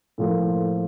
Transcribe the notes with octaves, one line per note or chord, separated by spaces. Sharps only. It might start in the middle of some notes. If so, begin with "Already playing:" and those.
A2 F3 A#3